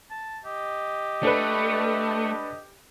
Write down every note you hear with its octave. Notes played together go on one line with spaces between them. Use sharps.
A5
G4 D#5
A3 D4 A4 B4